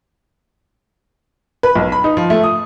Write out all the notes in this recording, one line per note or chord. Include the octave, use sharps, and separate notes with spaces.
B4
B1
B5
D#4
F3
A3
D#6